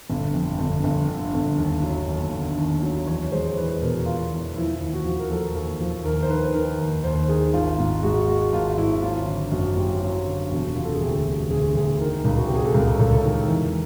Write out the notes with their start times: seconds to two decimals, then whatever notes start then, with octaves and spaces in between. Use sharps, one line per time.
0.10 G1
0.34 F2
0.59 G1
0.84 G1
1.09 D3
1.34 G1
1.58 D#2
1.83 F#3
2.07 D#2
2.32 D3
2.58 D#2
2.83 F#3
3.07 E2 C#5
3.32 G#3 C5
3.57 E2 B4
3.82 B2 A#4
4.06 B2 F4
4.31 E2
4.56 F3 E4
4.74 E4
4.81 D#2
4.93 F#4
5.05 F3
5.19 A#4
5.30 F3 A4
5.55 D#2
5.81 F3
6.05 D#2 A#4
6.23 C5
6.30 D#3 B4
6.54 D#3 A#4
6.79 D#2
7.04 D#2 C5
7.29 D#3 G#4
7.53 G#1 F4
7.78 G#2 F4
8.03 G#3 F#4
8.28 G#3 F#4
8.53 G#1 F4
8.77 G#1 E4
9.02 F#3 F4
9.27 D3
9.52 F#2 F#4
9.76 F#3 G4
10.01 F#3
10.26 D3
10.51 E1 F#4
10.76 C3 F4
10.85 A4
10.93 G#4
11.00 D2 G4
11.25 C3
11.50 D2 G#4
11.75 D2 G#4
12.00 D#3 A#4
12.25 C#2
12.37 F#4
12.46 C3 G4
12.55 G#4
12.65 A4
12.74 C#2 A#4
12.99 C#2 A4
13.13 A4
13.24 D#3 A#4
13.48 E2